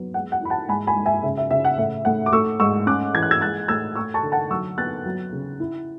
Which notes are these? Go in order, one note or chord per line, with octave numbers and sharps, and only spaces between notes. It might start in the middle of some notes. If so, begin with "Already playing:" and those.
Already playing: F#3 B3
G#3 F#5
F#5
E4 B5
F#5 A5
G#2 G#5 B5
G#5 B5
G#2
E5 G#5
C#3 E5
E5
C#3 E5
F#5
A2 E5
A2 F#5
D6
A3 C#6 E6
G#2 C#6 E6
C#4 D6 F#6
E3 G#6
F#6
E6 G#6
G#3 F#6 A6
A2 E6 G#6
A3 C#6 E6
A5 C#6
D3
F#5 A5
F#3 C#6 E6
B3 F#6 A6
F#3
C#3
E4